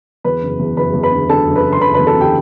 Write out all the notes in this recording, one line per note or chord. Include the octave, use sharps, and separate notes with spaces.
E2 B4 B5
F#1
E2
F#1 B4 B5
E2
B4 B5
D3
D3 A4 A5
F#1
B4 B5
F#1
C6
F#1 B4 B5
E2 B4 B5
A4 A5
D3 G4 G5